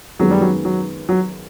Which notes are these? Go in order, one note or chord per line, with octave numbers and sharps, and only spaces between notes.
F#2 D#3 F#3 G#3 B3
G3
F#3
F#3
F#3